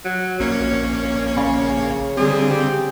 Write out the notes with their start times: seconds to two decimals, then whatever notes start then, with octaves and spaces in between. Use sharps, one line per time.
0.05 F#3
0.40 A#1 A#3 C#4 C#5
1.37 C#3
2.17 D3 G3 C4 G#4
2.51 G4